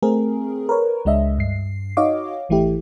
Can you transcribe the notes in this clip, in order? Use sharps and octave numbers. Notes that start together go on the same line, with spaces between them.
A3 C4 G#4 A#4
A#4 B4 C#5
C#2 G#3 D4 D#5 E5
G2 C7
D#4 F#4 C#5 D#5 F5 D6
G#1 E3 A3 E4 G4